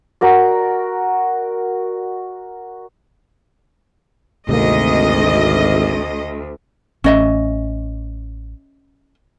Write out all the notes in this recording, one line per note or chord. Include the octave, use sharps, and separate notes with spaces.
F#4 A#4 D5
G#1 D2 C3 A3 A#3 D#5
A1 C#4 D#5 E5